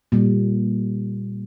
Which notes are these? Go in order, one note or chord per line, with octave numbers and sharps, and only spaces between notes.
A#2 G3